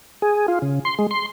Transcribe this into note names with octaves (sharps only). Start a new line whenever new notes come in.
G#4
F4
C#3
C6
G#3
C6